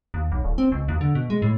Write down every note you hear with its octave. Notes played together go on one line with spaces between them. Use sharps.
D#2
B1
D1
C4
C#2
D#2
D3
B2
G#3
A2